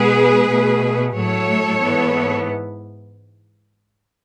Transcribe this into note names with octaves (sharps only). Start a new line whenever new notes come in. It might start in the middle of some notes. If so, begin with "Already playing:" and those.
Already playing: B2 G#3 B3 G#4 B4
B2 A3
A2 F#3 A3 A4 C#5
G#2 E3 B3